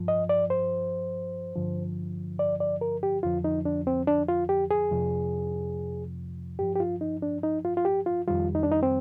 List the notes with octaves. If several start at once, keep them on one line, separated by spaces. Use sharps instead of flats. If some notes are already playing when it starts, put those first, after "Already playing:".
Already playing: G2 F3
D#5
D5
C5
G2 D3 F3
D5
D5
A#4
G4
F2 D3 F3 F4
D#4
D4
C4
D4
F4
G4
G#4
F2 C3 F3
G2 F3 G4
G4
F4
D#4
D4
D#4
F4
F4
G4
F4
F2 D#3 G3 F4
D#4
D4
D#4
C4